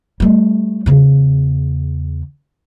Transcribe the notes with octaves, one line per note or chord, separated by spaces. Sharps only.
G3 A3
E2 C#3